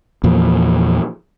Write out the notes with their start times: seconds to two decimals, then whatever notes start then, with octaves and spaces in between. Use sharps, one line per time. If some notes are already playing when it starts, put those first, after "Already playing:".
0.24 E2 A#2 F3